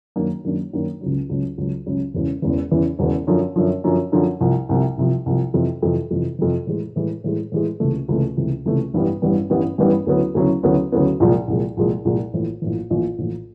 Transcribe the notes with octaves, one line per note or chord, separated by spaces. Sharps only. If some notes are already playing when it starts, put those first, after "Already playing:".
F#2 D#3 F#3 A#3 D4
F#2 D#3 F#3 A#3 D4
F#2 D#3 F#3 A#3 D4
C#2 C#3 F#3
C#2 C#3 F#3
C#2 C#3 F#3
C#2 C#3 F#3
E1 E2 C#3 E3
E1 E2 C#3 E3
E1 E2 C#3 E3
E1 E2 C#3 E3
F#2 D3 F3
F#2 D3 F3
F#2 D3 F3
F#2 D3 F3
C2 C3 F3
C2 C3 F3
C2 C3 F3
C2 C3 F3
F2 C3 E3
F2 C3 E3
F2 C3 E3
F2 C3 E3
A2 E3 G#3
A2 E3 G#3
A2 E3 G#3
A2 E3 G#3
C#2 C3 E3 A3
C#2 C3 E3 A3
C#2 C3 E3 A3
C#2 C3 E3 A3
A1 G2 E3 G3 B3
A1 G2 E3 G3 B3
A1 G2 E3 G3 B3
A1 G2 E3 G3 B3
D2 C#3 F#3 B3 E4
D2 C#3 F#3 B3 E4
D2 C#3 F#3 B3 E4
D2 C#3 F#3 B3 E4
C2 A#2 F3 G#3
C2 A#2 F3 G#3
C2 A#2 F3 G#3
C2 A#2 F3 G#3
A#1 A2 E3
A#1 A2 E3
A#1 A2 E3
A#1 A2 E3